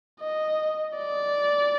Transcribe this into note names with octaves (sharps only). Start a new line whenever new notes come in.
D#5
D5